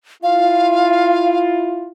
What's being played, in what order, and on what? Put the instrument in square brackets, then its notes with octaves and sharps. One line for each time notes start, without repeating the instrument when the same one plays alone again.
[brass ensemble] E4 F4 [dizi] F5